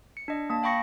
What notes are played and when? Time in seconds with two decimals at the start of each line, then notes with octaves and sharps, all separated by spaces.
0.17 C#7
0.28 D4 D#5
0.50 A#3 A5
0.63 F5 G5 B5 C#6 A#6 C#7